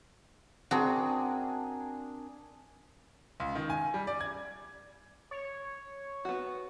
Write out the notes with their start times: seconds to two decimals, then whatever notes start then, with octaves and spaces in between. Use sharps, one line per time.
0.71 C4 D4 F#4 G#4 A#4
3.40 C#2
3.55 D#3
3.70 G#5
3.94 G3
4.07 D5
4.21 G#6
5.31 C#5
6.25 B3 F#4